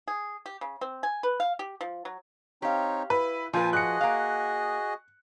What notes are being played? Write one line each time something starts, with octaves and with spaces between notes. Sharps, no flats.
G#4
G4
C#3
C4
G#5
B4
F5
G4
F3
F#3
C4 D#4 G4 C#5 F5
E4 B4
A#2 F3 F4 B4 C5 G#5 A5
F#4 G#4 D#5 F#6 C#7
A#3 F5